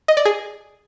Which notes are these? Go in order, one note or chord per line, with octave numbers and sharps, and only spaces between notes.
D#5
D5
G#4